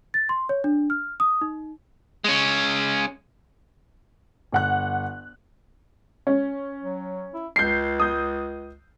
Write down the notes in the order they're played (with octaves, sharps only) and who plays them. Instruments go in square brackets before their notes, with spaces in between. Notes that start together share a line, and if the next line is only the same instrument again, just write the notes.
[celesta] A6
C6
C#5
D4
F6
D#6
D#4
[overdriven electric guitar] G#3 C#4
[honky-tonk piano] G1 F#5 F#6
C#4
[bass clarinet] F#3
E4
[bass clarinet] C#2 [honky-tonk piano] G6 C7
[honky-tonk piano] D#6 G6